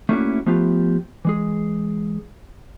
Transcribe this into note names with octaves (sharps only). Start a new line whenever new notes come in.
A3 A#3 C#4 D4 E4 F#4
F3 A3 B3 F4 G4
E3 G#3 G#4